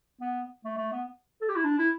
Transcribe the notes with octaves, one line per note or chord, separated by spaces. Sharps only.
B3
A3
A3
B3
A4
G4
E4
D4
E4